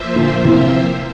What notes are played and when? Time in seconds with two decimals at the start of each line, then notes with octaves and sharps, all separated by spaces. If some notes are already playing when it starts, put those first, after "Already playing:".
Already playing: F3 A#3 F4 C5 E5
0.16 A#2 D3
0.44 C3 E3